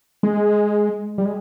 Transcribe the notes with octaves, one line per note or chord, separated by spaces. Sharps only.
G#3
G3
G#3